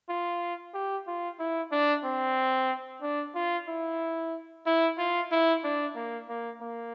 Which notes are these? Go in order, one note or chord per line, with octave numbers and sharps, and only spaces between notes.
F4
G4
F4
E4
D4
C4
D4
F4
E4
E4
F4
E4
D4
A#3
A#3
A#3